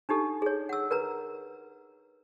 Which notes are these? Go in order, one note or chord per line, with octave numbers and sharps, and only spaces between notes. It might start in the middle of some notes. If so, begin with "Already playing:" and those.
D4 D#4 G4 A4
G#4 C#5
F#5 E6
A#4 B4 A#5